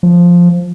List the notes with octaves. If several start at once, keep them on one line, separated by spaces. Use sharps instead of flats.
F3